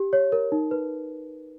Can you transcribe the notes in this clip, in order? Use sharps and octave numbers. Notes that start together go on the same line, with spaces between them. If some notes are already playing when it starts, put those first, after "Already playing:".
Already playing: G4
C#5
A#4
D#4
B4